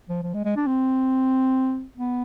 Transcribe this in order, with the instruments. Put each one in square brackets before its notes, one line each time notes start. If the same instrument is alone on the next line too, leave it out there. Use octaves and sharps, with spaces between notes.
[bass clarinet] F3
F3
G#3
G#3
D4
C4
B3